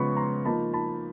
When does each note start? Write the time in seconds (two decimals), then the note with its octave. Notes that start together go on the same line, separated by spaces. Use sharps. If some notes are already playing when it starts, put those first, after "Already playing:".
Already playing: C#3 F3 G#3 B3 B5 C#6
0.17 A#5 C6
0.45 F3 A#3 D#4 A5 B5
0.73 A5 B5